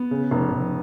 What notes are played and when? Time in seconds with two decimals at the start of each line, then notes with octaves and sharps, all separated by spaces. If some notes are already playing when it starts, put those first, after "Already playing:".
Already playing: B3
0.11 C#3
0.31 F1
0.52 F1